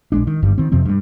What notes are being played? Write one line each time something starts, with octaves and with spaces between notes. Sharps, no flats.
A#1 G#3 D4
D#3
G1 G2 G3
D#3 C4
F2 C3 F3 C4
G2 G3